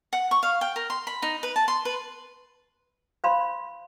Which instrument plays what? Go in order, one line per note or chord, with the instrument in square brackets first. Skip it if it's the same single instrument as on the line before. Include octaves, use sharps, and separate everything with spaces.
[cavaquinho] F#5
C#6
F5
G5
A#4
C6
B5
D#4
B4
A5
C6
B4
[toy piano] C5 F5 B5 C6